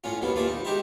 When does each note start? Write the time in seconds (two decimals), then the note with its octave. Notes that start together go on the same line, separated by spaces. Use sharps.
0.04 A2 C#4 F4
0.22 D#2 B2 F3 B3
0.35 D#2 F4 D5 E5
0.47 D#4
0.65 G#3 D#4 G4 C5 E5